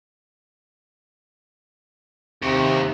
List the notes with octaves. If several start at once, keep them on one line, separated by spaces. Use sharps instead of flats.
D#2 C3